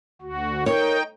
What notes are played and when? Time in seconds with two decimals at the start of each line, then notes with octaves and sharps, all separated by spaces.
0.22 D2 F#4
0.66 D#4 A#4 C#5 G5